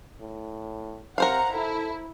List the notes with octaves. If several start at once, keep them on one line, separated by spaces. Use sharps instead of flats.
A2
C3 A#4 C5 F5 F#5 A#5
E4 A4